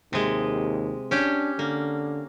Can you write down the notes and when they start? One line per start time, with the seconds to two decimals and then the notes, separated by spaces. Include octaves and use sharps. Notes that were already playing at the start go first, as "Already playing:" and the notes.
0.13 D#2 C3 G#3
1.11 C#4 D4 G4
1.59 D3 A#3